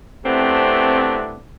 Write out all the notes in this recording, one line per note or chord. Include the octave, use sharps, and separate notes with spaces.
C3 A3 B3 C4 D4 E4